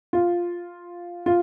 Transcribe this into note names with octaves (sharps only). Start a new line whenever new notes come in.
F4
F4